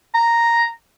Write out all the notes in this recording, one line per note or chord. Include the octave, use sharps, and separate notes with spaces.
A#5